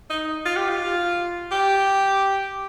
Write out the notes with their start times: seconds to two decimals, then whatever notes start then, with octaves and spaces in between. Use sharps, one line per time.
0.10 D#4
0.45 F4
0.57 G4
0.69 F4
1.52 G4